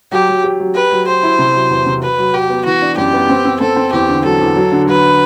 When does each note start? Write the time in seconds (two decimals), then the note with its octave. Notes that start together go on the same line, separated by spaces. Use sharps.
0.12 F#3 G4
0.29 F#3
0.44 G4
0.60 F#3
0.75 G4 B4
0.92 F#3
1.07 G4 C5
1.23 E4
1.39 C3
1.55 F#3
1.70 E2
1.86 C3
2.02 F#4 B4
2.18 F#3
2.33 F#4 G4
2.49 B3
2.65 E3 F#4
2.82 D4
2.97 F#2 G4
3.13 B3
3.29 C4
3.45 C4
3.60 C4 A4
3.76 C4
3.93 E2 G4
4.09 D3
4.24 F#3 A4
4.41 E2
4.56 F#3
4.72 D3
4.87 F#3 B4